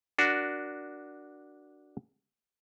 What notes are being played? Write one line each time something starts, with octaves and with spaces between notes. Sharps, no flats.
D4 F#4 A#4